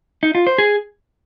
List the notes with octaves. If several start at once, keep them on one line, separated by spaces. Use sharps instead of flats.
D#4
F4
C5
G#4